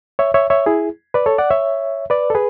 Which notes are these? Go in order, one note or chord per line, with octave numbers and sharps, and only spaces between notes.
C#5 E5
C#5 E5
C#5 E5
E4 G#4
B4 D5
A4 C#5
D5 F#5
C#5 E5
B4 D5
A4
G#4 B4